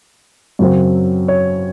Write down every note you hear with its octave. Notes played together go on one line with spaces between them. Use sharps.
F#2 C#3 F#3 C4
C#5